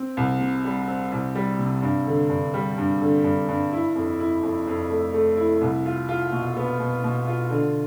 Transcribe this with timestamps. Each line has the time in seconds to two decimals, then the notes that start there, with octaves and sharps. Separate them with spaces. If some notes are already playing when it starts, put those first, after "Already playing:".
Already playing: C4
0.17 C2
0.40 C3
0.64 G3
0.88 C4
1.12 C2
1.35 G3
1.59 C3
1.82 G2
2.07 D3
2.30 G2
2.54 G3
2.78 G2
3.02 D3
3.24 G2
3.49 G2
3.73 E4
3.96 F2
4.20 E4
4.43 F2
4.67 F2
4.90 A3
5.14 A3
5.37 E4
5.61 C2
5.86 F4
6.09 F4
6.32 B2
6.56 B3
6.79 B2
7.04 B2
7.27 F4
7.50 D3